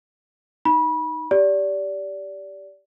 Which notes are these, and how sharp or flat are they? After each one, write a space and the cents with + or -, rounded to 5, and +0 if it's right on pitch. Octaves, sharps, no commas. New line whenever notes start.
D#4 +0 B5 -25
G4 +0 D5 -20